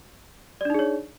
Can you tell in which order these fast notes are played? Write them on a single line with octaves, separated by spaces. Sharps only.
D5 D4 D#4 G#4 C#5